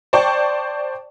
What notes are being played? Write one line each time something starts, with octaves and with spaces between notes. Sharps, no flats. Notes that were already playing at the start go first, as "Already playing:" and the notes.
C5 D5 G5 A5 C#6